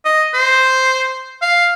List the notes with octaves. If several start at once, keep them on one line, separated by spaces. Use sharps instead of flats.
D#5
C5
F5